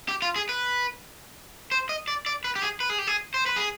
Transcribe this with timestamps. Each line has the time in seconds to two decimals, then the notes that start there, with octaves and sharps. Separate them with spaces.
0.09 G4
0.22 F4
0.36 G#4
0.49 B4
1.71 C5
1.89 D#5
2.08 D5
2.26 D5
2.44 B4
2.56 G4
2.62 G#4
2.80 B4
2.90 G#4
2.99 G4
3.07 G#4
3.34 C5
3.46 B4
3.56 G#4